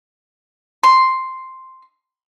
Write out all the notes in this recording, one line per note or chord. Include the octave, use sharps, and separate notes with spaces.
C6